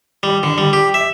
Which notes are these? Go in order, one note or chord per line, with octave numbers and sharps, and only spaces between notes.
G3
D3
G3
G4
E5